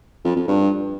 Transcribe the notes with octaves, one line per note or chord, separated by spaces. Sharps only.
F2
F2
G2